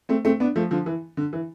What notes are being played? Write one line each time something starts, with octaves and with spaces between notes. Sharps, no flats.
A3 C4
A3 C4
B3 D4
F3 A3
D3 F3
E3
D3
E3